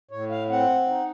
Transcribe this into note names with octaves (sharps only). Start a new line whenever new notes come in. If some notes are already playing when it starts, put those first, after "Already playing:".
A2 C#5
F5
C4 F#5
D#4